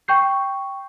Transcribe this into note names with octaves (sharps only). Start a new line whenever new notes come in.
G5 C#6 G6 C7